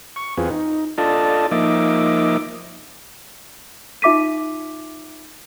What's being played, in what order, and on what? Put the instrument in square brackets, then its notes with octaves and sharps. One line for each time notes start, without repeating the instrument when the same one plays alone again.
[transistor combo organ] C#6
E2 C4 F4 G#4 B4
D#4
D4 F4 A4 D5 D#5 A5
F3 A#3 D#4 D#5 E5 D6
[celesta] D#4 F4 E5 D6 B6 D#7